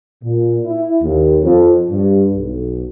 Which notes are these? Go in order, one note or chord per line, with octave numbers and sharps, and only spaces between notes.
A#2
E4
D#2
F2
G2
B1